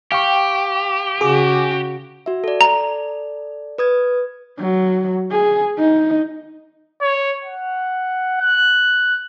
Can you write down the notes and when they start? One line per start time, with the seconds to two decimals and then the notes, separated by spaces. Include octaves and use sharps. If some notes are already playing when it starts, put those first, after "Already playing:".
0.12 G4 F5 G5 C#6
1.21 C#3 F#4 G#4 D6
2.26 F#4 E5
2.44 A4 D5
2.61 A#5
3.78 B4 D#6 G#6
4.60 F#3
5.32 G#4
5.78 D#4
7.02 C#5
7.44 F#5
8.41 F#6